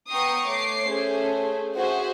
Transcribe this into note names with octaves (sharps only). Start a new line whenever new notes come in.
B3 G5 A#5 C#6 D#6 C7
A3 C#5 D6 C7
A3 C#4 G#4 A4 C5
F#4 G#4 C5 E5